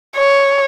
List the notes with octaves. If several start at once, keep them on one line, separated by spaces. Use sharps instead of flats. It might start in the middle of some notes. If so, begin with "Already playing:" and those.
C#5